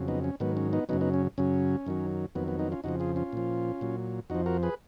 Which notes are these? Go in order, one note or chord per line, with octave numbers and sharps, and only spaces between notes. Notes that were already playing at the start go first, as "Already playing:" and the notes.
Already playing: F2 C#3 F#3
B3 D#4
C#4
G#2 D#3 F#3 B3
C#4
B3 D#4
F#2 C#3 F#3 B3 D#4
B3 D#4
C#4
F#2 C#3 F#3 C#4
F#2 D#3 F#3
F2 D#3 F#3 B3
B3
B3 D#4
C#4 F4
F2 C#3 F3 D#4 F#4
F4 G#4
C#4 F4
A#2 F3
A#2 F#3
F2 F3 D#4 F#4
F#4 A#4
G#4 B4